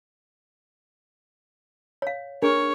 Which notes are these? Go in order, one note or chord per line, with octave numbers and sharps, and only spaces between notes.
C#5 F5
D4 G#4 A#4 C#5